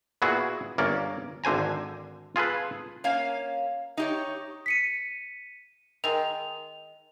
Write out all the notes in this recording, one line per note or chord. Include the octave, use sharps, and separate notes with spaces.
A#2 B3 E4 F#4 G#4
G1 A#3 C#4 A#4 D5
G#1 D3 C5 G#5 A#5
F4 G#4 A4 B4
A#3 C#4 F5
D#4 G4 C#5
B6 C#7 D#7
D#3 G#3 F7